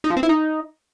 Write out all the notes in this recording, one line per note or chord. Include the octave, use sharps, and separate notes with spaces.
D#4
F3
C4
E4
D#4